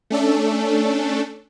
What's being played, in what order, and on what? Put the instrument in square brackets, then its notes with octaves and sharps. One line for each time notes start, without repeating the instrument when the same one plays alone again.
[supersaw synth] A3 C#4 D4 A4